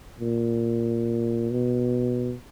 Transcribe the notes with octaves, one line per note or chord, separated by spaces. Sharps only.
A#2
B2